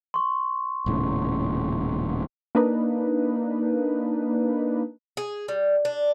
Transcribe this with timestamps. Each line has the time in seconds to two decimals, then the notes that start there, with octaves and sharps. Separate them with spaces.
0.14 C6 C#6
0.86 D#1 A2 C#3
2.55 A#3 D4 D#4 B4
5.17 G#4
5.48 G3
5.85 D4